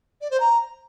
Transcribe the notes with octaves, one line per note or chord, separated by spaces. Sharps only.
D5
C5
A#5